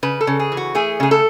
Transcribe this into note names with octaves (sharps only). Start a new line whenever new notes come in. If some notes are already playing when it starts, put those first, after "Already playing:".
C#3 B4
A4
C#3
G#4
E3
F#4
A3 G#4
C#3 G#4
A4